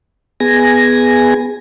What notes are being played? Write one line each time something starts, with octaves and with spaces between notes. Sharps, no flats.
B3 G#4 G#5 A#6